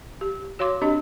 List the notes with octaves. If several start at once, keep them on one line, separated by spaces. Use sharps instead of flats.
G4
F#4 C#5 F5 C6 D6
C4 D4 G4 D#5